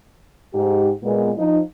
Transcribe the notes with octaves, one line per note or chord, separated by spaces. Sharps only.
G#2 G4
A#2 G#3 B3
F3 D#4